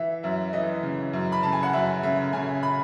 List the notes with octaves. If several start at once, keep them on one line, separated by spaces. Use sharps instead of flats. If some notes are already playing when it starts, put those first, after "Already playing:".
Already playing: E3 E5
F#2 E5
E3 D#5
C#3
F#2
B5
C#3 A5
G#5
F#5
F#2 E5
C#3 E5
C#3 G#5
B5